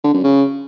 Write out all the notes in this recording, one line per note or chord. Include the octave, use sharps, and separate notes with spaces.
D3
F#2
C#3